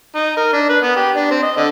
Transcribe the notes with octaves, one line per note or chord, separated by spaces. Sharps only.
D#4
A#4
D4
B4
B3
G4
D4
C4
D#5
D3